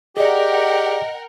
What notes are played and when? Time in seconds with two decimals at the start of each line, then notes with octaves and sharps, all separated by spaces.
0.17 G4 G#4 A#4 D5 D#5 F#5 G5